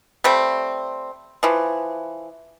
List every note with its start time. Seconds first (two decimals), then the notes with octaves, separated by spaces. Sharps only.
0.24 G3 A3 C4
1.43 E3 F3